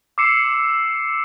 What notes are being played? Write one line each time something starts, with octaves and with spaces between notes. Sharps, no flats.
D6 E6 C7 C#7 E7